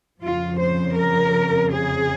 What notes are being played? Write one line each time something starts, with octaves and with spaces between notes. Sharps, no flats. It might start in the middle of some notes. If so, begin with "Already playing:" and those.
F2 C#3 F3 F4
C5
A#4
G#4